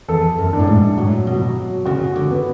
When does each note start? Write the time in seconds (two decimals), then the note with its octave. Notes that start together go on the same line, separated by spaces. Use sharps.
0.08 E2 A4
0.38 F#2
0.53 D4
0.59 A2
0.67 G#2
0.97 A2 F#3
1.27 B2
1.42 F#3
1.85 C#3 F#4
2.16 D3
2.31 B3